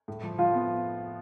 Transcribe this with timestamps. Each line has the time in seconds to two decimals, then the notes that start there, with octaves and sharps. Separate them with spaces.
0.08 A2
0.23 F3
0.38 F3 F4
0.54 B3